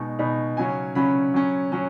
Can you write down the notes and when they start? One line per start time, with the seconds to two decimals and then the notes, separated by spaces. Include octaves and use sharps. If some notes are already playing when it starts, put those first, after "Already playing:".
Already playing: B2 G#3 D#4 C#6
0.19 B2 G#3 D#4 B5
0.57 C#3 F#3 C#4 G#5
0.95 C#3 F#3 C#4 B5
1.34 F#3 C#4
1.72 F#3 C#4